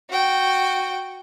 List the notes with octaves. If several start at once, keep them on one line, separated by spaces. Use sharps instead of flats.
F#4 G5